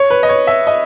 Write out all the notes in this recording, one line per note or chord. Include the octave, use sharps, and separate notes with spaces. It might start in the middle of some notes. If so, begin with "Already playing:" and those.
Already playing: C#5
B4
D#5
C#5
E5
D#5